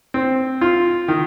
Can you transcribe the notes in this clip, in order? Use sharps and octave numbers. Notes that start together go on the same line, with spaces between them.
C4
F4
D#3